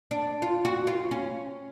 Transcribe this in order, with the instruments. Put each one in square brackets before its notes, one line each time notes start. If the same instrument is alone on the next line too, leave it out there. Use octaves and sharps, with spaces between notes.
[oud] D4
F4
F#4
F4
C#4